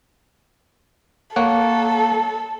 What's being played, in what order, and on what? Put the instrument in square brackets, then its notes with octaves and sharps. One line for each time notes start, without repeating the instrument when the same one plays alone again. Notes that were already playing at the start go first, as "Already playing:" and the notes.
[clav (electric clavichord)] A#3 C#5 F#5 [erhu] A4